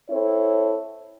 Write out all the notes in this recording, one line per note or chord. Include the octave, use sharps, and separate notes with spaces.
C4 E4 A4 C#5